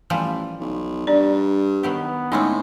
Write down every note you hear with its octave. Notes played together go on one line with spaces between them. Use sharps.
A1 E3 F3 G3
B1
G2 D4 D5
D#3 F#3 B3 G4
A2 G#3 C4 C#4 D#4